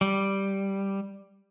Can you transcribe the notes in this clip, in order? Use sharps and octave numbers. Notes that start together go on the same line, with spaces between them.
G3